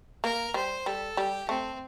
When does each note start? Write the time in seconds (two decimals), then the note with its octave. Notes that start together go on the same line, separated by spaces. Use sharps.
0.24 A#3 A#4
0.54 G3 C5
0.86 G3 A4
1.17 G3 G4
1.49 A3 C4